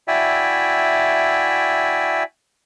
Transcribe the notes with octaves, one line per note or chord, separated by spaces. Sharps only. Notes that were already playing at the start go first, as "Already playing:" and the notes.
E4 F#4 D5 E5 G5 G#5